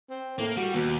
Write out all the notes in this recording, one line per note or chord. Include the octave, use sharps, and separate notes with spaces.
C4
A2 A#3
G3 F#4
D#2 B2